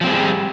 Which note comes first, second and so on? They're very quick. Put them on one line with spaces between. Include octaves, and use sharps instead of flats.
F3 C4 G3 G#4